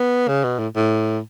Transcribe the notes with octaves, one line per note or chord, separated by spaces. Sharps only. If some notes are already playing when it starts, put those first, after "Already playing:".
Already playing: B3
C#3
B2
A2
A2